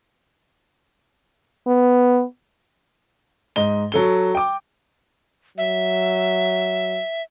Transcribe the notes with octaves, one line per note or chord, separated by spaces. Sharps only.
B3
G#2 D#5 G7
F#3 A4 G7
G5 D6
F#3 E5